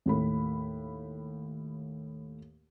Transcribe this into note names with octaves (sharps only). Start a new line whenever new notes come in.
D#2 A2 B5